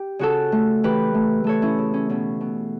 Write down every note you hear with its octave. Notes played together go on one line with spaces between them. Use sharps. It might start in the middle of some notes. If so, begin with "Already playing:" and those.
Already playing: G4
C#3 F#4 A4
A3
E3 G4 B4
A3
A3 A4 C#5
C#4 E4
C#3
C#4
B2 C#4
B2